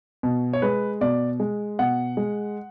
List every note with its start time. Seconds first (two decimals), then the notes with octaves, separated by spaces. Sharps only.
0.23 B2
0.53 C#5
0.62 G#3 B4
1.01 B2 D5
1.40 G#3
1.79 B2 F#5
2.17 G#3